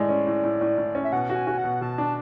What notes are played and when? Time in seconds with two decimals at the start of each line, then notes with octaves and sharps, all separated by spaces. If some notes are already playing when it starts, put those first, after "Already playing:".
Already playing: A2 G#3 D5
0.09 C#4
0.27 A2
0.44 A2
0.61 A2
0.78 A2
0.95 C#4
1.04 E5
1.12 B2 F#5
1.30 F#4
1.35 G#5
1.47 F#4
1.58 F#5
1.64 B2
1.81 B2 A5
1.98 D4